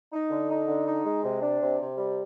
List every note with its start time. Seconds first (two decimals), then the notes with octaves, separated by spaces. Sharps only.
0.12 D#4
0.30 D3
0.50 D#4
0.68 D3
0.86 D#4
1.05 G#3
1.23 C3
1.42 D4
1.60 C3
1.79 C3
1.97 G3